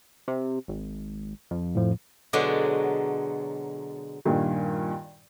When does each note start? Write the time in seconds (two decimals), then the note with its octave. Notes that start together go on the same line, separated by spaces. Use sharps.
0.28 C3
0.68 G#1
1.51 F2
1.75 A2 F3
2.33 B2 D3 F#3 G#3 D4
4.25 G2 A#2 D#3 G3